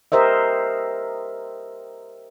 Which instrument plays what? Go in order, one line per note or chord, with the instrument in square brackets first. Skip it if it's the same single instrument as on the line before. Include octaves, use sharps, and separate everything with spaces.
[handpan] G4 A#4 C5 D#5 E5